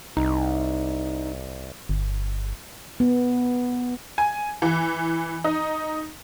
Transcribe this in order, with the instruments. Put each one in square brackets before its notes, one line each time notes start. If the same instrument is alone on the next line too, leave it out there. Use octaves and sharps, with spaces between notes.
[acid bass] C2 [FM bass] D#4
[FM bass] G1
[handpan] B3
[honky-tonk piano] G#5
E3
D#4